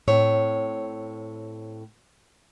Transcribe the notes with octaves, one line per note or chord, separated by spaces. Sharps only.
A2 C4 C#5